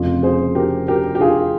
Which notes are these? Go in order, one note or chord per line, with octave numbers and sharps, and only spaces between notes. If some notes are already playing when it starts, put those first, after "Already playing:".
Already playing: F1 F2 C#3 F4
G#4 C5
G4 A#4
G4 A#4
G4
F4 G#4